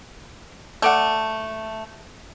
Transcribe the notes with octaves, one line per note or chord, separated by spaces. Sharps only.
A3 D5 F#5